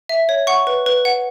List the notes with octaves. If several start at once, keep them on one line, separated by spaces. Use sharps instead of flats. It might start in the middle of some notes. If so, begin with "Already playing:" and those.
E5
C#5
F#5 C#6
B4
B4
F#5